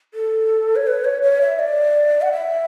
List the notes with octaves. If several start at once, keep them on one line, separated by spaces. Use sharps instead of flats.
A4
C#5
B4
C#5
C#5
E5
D5
F#5
E5